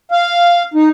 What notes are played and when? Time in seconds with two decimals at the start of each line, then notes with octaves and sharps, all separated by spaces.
0.11 F5
0.74 D#4